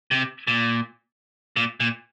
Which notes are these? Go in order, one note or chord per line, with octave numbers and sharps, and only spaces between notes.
C3
A#2
A#2
A#2